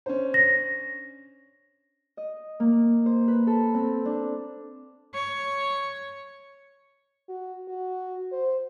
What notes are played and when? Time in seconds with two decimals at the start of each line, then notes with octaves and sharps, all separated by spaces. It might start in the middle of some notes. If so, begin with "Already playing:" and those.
0.06 C#4 D4 C5
0.34 A#6
2.17 D#5
2.60 A#3
3.06 C5
3.28 B4
3.47 A4
3.75 C4
4.05 D4
5.13 C#5
7.29 F#4
7.68 F#4
8.32 C5